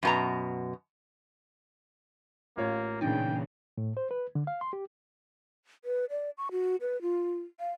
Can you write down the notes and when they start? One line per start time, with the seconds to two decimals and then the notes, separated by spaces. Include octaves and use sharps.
0.03 F#2 B2 A#5
2.57 A1 A#3 F4 C#5
3.01 A#2 C#3 E3 D4 D#4 G5
3.78 A2
3.97 C5
4.11 B4
4.35 D3
4.47 F5
4.61 C6
4.73 G4
5.85 B4
6.10 D5
6.38 C#6
6.52 F#4
6.81 B4
7.02 F4
7.60 F5